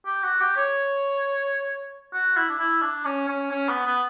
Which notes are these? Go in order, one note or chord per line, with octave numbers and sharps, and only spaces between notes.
G4
F#4
G4
C#5
F#4
E4
D4
E4
D4
C#4
C#4
C#4
B3
B3